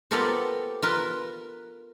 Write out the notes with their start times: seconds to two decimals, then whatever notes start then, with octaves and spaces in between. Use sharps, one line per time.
0.11 B3 F4 G4 A4 A#4 C5
0.82 F4 A#4 B4